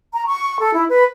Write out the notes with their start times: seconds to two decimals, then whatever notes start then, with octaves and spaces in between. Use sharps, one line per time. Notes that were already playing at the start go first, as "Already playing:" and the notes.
0.13 A#5
0.26 C#6
0.60 A4
0.73 E4
0.89 B4